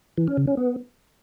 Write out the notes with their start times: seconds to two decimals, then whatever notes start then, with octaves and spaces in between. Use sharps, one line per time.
0.18 E3
0.27 C#4
0.37 C#3
0.47 C#4
0.57 B3